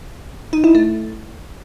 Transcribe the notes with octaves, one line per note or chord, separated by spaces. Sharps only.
D#4
E4
A3